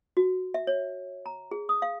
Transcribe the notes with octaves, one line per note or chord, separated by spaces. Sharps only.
F#4
E5
C#5
A#5
G#4
D#6
F5